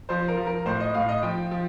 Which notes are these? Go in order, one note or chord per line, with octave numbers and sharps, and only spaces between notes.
F3 C5
A#4
F3
A#4
A2 C5
D#5
A2 F5
D#5
F3 G5
F3